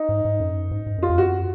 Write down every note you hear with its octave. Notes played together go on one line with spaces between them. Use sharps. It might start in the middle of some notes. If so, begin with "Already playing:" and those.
Already playing: D#4
G#2
G#2
F#2
G#2
G#2
F#2 F4
F2
F#2 F#4